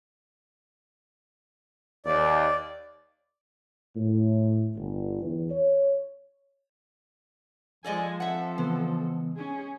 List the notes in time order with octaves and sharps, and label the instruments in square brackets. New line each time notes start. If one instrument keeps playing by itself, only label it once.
[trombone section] D#2 [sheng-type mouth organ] D5
[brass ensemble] A2
G1
E2
C#5
[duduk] F3 [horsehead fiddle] G#3 G#5 [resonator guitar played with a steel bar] A4 D5 D#5
[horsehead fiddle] C4 A4 [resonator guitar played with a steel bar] E5 F#5
[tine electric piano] C#3 E3 B3 [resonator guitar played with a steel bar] G#3
[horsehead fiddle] C#4 G#4